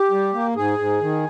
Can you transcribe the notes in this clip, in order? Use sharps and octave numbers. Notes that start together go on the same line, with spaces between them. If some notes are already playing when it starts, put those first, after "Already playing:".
Already playing: G4
G3
A#3
G#2 G#4
G#2
D#3